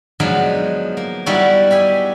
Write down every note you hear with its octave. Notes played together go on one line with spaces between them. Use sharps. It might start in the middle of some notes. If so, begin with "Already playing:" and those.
F3 F#3 G#3 B3 D#4 D5
A#3
G3 B3 D#4 E4 F#4 D5
G4 E5 G#5